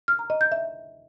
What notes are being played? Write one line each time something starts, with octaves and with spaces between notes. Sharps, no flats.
F6
A#5
D#5
G6
E5